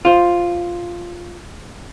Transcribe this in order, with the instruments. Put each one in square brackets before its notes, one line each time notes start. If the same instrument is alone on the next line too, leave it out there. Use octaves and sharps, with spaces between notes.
[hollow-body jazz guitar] F4 C5